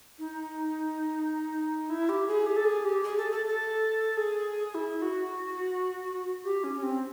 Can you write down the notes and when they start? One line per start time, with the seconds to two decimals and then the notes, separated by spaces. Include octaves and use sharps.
0.19 D#4
1.90 E4
2.09 G4
2.28 G#4
2.46 G4
2.56 A4
2.65 G#4
2.85 G4
3.03 G#4
3.18 A4
3.32 A4
3.47 A4
4.17 G#4
4.75 E4
5.02 F#4
6.45 G4
6.64 C#4
6.75 C#4
6.83 C4